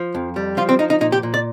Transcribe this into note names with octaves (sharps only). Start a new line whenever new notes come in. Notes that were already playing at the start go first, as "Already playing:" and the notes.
Already playing: F3
F2
G3
F3 F4
C4
F3 D#4
D#4
A#2 D#4
G4
A#2
D5